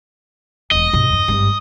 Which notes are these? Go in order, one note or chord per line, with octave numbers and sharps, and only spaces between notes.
E1 E3 D#5
G2 B2
E2 G2
G#1 G2